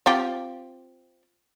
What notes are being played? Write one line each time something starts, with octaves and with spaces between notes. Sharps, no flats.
C4 F4 G4